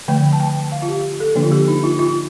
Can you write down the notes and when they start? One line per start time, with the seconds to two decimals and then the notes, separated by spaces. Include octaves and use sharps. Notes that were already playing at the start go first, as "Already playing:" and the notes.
0.08 D3 F3 A3 G5
0.33 A5
0.40 G5
0.72 F5
0.82 F4
0.88 G4
1.20 A4
1.35 D3 F3 A#3 D4
1.43 F4
1.51 G4
1.68 D#4
1.84 F4
1.99 F4